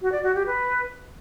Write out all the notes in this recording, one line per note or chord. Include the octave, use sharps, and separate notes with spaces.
F#4
D5
F#4
G4
B4